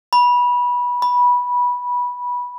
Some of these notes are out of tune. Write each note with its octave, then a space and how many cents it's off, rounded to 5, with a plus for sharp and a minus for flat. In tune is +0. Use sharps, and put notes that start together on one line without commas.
B5 -20
B5 -15